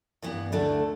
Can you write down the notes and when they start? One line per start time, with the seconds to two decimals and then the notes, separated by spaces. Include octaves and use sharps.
0.22 G2 E3 B3
0.52 D2 D3 A3 D4